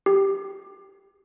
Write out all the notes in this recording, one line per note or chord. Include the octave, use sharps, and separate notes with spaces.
G4